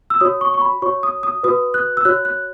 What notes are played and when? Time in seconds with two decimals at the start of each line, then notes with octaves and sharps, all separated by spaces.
0.10 E6
0.20 F#4 C#5 D#6
0.41 C#6
0.54 C#6
0.61 B5
0.82 F#4 C#5 C#6
1.03 D#6
1.23 D#6
1.43 F#4 B4 D#6
1.74 F#6
1.97 E6
2.05 F#4 C#5 F#6
2.25 F#6